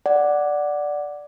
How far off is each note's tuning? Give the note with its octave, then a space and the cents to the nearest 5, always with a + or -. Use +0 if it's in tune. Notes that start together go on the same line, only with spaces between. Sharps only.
D5 +0 F#5 +0